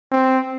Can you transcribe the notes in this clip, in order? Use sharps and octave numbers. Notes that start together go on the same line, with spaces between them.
C4